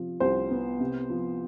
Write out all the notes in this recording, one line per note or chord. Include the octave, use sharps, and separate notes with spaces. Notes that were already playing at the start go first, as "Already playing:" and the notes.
Already playing: C3 F3
C2 C5
B3
C3
F3